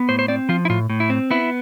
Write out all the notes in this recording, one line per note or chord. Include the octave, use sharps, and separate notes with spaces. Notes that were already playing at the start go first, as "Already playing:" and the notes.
Already playing: B3
A2 C5
C5
C4 D5
F3 F4
E4
A2 F4
A2
E4
C4
B3 E4